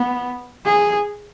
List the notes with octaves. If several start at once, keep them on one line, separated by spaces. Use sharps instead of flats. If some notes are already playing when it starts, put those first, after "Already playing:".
Already playing: B3
G#4